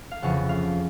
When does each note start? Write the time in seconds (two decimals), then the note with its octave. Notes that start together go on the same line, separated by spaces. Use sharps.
0.11 F5
0.22 F1 F2 C#3 E3 F#5
0.49 F5